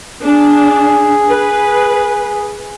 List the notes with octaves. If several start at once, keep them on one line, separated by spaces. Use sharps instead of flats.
D4 G#4
B4